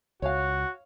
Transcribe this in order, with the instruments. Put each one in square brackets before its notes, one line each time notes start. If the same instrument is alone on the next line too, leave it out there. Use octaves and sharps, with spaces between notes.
[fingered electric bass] C#2 [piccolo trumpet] F#4 [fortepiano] C#5 F5